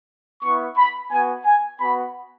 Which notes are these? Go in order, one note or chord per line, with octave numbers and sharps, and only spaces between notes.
B3 E4 C#6
B5
B3 F#4 G#5
G#5
B3 F#4 B5